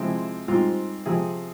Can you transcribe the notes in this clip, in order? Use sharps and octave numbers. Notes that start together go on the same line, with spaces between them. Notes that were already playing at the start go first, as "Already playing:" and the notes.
Already playing: C3 F3 G#3 C4 E4
G#2 G3 C4 F4
C3 F3 C4 G#4